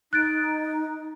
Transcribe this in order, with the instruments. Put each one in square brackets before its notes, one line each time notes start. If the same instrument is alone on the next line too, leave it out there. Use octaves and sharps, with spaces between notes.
[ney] D#4 [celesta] F#6 A6 D7